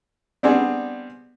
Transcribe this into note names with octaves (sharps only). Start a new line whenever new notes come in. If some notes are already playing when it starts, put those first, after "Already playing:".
G3 B3 C4 D4 G#4